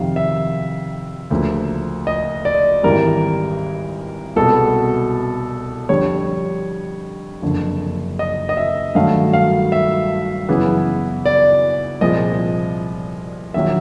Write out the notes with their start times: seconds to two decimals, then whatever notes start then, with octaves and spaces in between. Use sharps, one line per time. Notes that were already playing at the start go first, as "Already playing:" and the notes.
Already playing: F2 C3 D#3 F5
0.16 E5
1.31 D2 C#3 F3 A#3
2.07 D#5
2.45 D5
2.83 G#1 G#2 E3 G3 A#4
4.36 C2 B2 G#3 B3 A4
5.89 F2 D3 G3 C#5
7.42 F#1 F2 D3
8.19 D#5
8.49 D#5
8.57 E5
8.95 G2 D#3 F#3 A3 F5
9.33 F5
9.72 E5
10.49 F#2 C#3 E3 G#3 B3
11.26 D5
12.01 C2 A#2 F3 G#3 D#5
13.54 A#1 D#3 F#3 A#3 E5